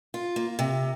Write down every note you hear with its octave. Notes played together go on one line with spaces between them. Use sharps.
F4
A#3
C3